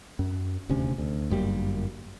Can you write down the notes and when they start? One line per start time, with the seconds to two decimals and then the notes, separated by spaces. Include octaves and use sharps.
0.19 F#2
0.69 D#1 D2 C3 C#4
0.98 D2
1.30 G1 F#2 G3 A#3